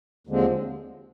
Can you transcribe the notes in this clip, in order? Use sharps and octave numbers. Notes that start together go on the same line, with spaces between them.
D#2 D3 F3 G#3 C4